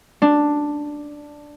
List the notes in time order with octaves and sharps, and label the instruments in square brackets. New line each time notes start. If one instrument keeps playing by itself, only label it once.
[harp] D4